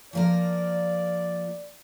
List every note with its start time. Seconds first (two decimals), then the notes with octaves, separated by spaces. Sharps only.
0.13 F3 A#3 A#4 D5